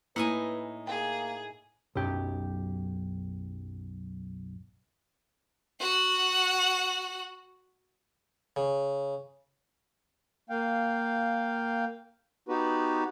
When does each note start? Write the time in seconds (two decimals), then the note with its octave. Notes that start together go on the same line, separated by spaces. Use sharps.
0.16 A2 A#3 D#4 E4 B4 G#5
0.87 A#3 G#4 G5
1.95 B1 F#2 G4
5.81 F#4 F#5
8.56 C#3
10.50 A#3 F5 G5
12.49 B3 D#4 F#4 G4 B4